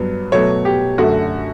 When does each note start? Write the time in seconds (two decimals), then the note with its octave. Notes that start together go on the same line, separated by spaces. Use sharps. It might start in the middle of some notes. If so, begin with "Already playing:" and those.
Already playing: G2 F#3 B3
0.32 B2 F#3 A3 C#5
0.65 G4
0.98 F#2 D3 A3 F#4